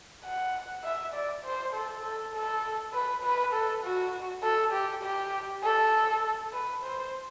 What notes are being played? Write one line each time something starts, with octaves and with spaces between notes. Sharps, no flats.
F#5
E5
D5
C5
A4
A4
A4
B4
B4
A4
F#4
A4
G4
G4
A4
B4
C5